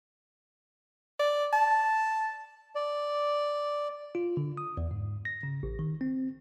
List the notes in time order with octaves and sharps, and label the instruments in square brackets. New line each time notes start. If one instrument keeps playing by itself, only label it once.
[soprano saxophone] D5
A5
[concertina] D5
[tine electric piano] F4
D3
D#6
E2
G#2
A#6
C#3
A1
D#3
C4